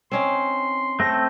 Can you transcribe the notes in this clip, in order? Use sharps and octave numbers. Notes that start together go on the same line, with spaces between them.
C4 C#4 D#4 C6
A3 C4 A4 A#6